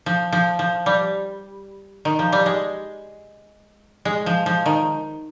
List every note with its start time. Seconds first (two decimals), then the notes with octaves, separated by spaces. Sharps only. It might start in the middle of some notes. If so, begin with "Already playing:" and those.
0.06 F3
0.33 F3
0.59 F3
0.86 G3
2.05 D#3
2.19 F3
2.32 G3
2.46 G#3
4.05 G#3
4.26 F3
4.46 F3
4.66 D#3